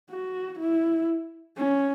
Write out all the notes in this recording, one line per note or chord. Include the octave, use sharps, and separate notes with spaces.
F#4
E4
C#4